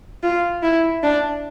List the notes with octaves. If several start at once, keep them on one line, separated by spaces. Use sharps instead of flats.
F4
E4
D4